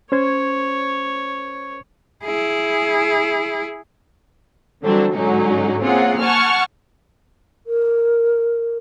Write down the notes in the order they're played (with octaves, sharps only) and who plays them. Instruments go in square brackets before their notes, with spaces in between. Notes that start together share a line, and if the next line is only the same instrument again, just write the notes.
[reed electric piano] C#4 C5 G#6 [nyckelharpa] C#5
[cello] E4 G#4
[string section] D3 E3 F#3 G3 C4 D4
G#2 D3 F#3 G#3 C#4 D#4
A#3 C4 C#4 F4 G#4 F#5
F#5 G#5 A5 C#6 F6
[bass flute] A#4